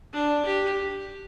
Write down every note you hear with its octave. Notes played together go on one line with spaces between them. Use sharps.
D4
G4